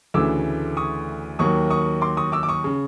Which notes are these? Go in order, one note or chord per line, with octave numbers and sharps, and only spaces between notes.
D2 C#3 E3 A3 D6 E6
C#6 D#6
D#2 D#3 F#3 A#3 C#6 D#6
C#6 D#6
C6 D6
C#6 D#6
D6 E6
D6
C#6 D#6
C#3